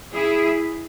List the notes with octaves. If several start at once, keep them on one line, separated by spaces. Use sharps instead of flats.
E4 G#4